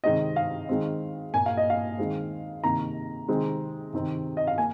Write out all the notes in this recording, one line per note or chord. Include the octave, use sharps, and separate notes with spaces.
C3 D#3 G#3 C4 D#5
F5
D#3 G#3 C4
A#2 A#3 G#5
F5
D#5
F5
D#3 G#3 C4
C3 D#3 A#3 A#5
C3 D#3 G#3 C4
C3 D#3 C4
D#5
F5
A#3 G#5